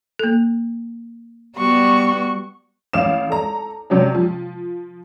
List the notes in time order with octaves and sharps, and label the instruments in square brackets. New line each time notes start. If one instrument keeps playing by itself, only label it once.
[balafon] A#3 A4
[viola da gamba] G3 B3 F#4 [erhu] C#6
[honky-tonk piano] A1 F5 D6 E7
A4 A#5
C3 F#3 C#4 D4
F3